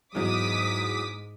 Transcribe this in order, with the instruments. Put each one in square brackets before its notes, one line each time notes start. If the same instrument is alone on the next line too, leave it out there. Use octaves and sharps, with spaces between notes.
[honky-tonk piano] E2 F#3 [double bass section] G#2 [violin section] D6 D#6 B6